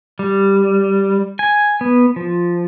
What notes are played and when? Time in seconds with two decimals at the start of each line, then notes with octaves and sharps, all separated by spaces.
0.19 G3
1.39 G#5
1.81 B3
2.16 F3